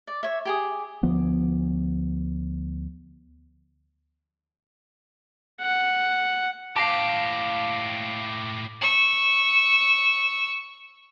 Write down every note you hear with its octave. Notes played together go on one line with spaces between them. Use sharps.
D5
C#5 E5
G4 G#4 D#6
D2 F3 B3
F#5
A2 G4 F5 A5 D6 A#6 C7
C#6 E6